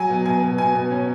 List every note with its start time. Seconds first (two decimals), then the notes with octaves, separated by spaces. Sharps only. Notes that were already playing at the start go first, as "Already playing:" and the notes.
Already playing: F#3 G#5
0.09 B2
0.25 B2 G#5
0.42 B2
0.58 B2 G#5
0.75 B2
0.91 C#4